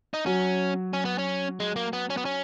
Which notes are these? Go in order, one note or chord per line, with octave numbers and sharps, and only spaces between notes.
D#4
F#3 C#4 F#4
C#4
B3
C#4
G#3
A#3
B3
C#4
B3
C#4